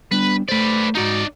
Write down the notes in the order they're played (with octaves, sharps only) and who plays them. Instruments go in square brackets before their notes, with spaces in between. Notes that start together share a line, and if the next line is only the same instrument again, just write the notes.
[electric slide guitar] G3 B3 D4 [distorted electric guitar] B4
[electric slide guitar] A3 A4 C5 [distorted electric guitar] B4 D5
[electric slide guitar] G#2 F#4 A#5 [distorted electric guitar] D#4 D5